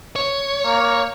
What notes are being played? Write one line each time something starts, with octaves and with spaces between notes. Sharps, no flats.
C#5
A#3